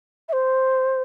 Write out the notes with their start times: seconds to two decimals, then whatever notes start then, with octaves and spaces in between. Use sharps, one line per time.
0.29 E5
0.33 C5